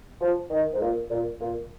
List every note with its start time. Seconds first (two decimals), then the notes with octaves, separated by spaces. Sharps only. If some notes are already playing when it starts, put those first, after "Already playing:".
0.21 F3
0.50 D#3
0.73 G#2
0.80 A#2
1.09 A#2
1.40 A#2